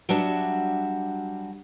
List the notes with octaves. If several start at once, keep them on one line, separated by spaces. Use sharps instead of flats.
F#3 G3 D4 F#4 E5